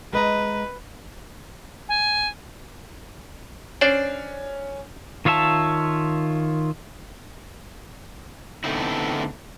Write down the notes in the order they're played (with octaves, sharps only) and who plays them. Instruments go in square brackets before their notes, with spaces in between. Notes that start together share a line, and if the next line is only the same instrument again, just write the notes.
[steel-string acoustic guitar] G#3 D#5 A#5 [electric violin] B4
[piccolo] G#5
[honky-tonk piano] C#4 [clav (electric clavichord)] D4 C5 D5
[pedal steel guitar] D#3 F4 C#5 E5 A5
[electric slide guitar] D3 A3 B3 C4 D#4 E4